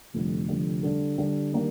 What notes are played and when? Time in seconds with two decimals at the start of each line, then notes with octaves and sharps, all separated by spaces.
0.14 F1 F2 D3 G3
0.49 F1 F2 D3 G3
0.83 D3 G3 D4
1.18 D3 G3 D4
1.52 D#3 G3 A#3 D4